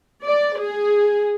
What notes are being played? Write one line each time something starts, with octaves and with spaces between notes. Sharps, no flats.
D5
G#4